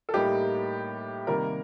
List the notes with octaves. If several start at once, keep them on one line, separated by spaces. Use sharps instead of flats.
A4
A2 G3 A#3 D#4 G4
C3 D#3 G3 A#3 A#4